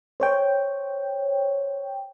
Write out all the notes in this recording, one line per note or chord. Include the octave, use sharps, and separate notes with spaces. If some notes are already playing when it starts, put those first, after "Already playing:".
C5 C#5 G5